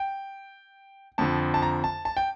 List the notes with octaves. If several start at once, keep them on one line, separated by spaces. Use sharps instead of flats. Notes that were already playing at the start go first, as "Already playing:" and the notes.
Already playing: G5
F2 D3 F3 A5
A5
A#5
A5
A5
G5